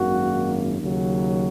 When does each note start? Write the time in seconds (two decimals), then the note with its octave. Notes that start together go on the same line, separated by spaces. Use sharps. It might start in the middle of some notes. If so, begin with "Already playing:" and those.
Already playing: G#1 F#2 D#3 A#3 F#4
0.79 D#2 C#3 F#3